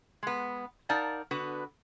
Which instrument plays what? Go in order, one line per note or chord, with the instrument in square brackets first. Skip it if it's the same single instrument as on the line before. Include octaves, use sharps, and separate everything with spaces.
[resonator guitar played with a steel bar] G#3 B3
D#4 A#4 D5 F5 F#5 A5
D3 B3 F#4 B4